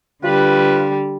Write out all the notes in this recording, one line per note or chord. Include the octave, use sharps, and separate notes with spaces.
D3 G3 F4 B4